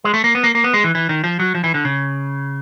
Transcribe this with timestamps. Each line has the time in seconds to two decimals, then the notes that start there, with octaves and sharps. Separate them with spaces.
0.04 G#3
0.14 A3
0.24 A#3
0.35 B3
0.44 A#3
0.55 A#3
0.64 B3
0.74 G#3
0.84 E3
0.95 E3
1.09 D#3
1.24 F3
1.39 F#3
1.55 F3
1.64 E3
1.74 D3
1.85 C#3